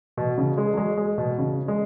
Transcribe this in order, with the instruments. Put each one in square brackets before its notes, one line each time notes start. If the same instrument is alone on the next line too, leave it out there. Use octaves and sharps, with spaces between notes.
[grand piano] B2
C#3
G#3
F#3
G#3
G#3
B2
C#3
G#3